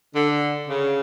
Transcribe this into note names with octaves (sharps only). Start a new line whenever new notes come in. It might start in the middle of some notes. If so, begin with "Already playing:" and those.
D3
C#3